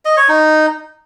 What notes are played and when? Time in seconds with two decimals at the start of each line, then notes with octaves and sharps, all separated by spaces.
0.05 D#5
0.17 C#5
0.29 D#4